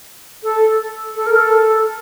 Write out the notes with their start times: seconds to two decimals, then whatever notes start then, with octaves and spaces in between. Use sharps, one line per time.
0.43 A4
1.16 A4
1.26 A#4
1.36 A4